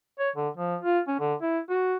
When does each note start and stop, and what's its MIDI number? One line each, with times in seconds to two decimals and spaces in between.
0.19 0.30 73
0.36 0.49 50
0.57 0.76 53
0.82 0.99 65
1.08 1.15 61
1.20 1.34 50
1.42 1.59 64
1.69 1.96 66